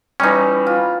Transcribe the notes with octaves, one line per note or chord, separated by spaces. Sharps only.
E3 G3 C#4 D#4
F4